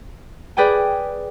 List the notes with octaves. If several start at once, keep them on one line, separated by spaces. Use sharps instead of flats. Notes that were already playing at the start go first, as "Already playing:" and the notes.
G#4 B4 D5 G5 G#5